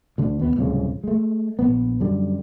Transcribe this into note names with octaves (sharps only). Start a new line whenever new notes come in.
D2 D3 D4
D#2 B3
D1 C2 F2 C#3
G#3 A3
A#1 B3
F#2 D3 G3